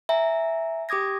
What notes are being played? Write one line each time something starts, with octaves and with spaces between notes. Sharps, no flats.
E5 G#5 A#5
G4 D6 D#6 G#6 A#6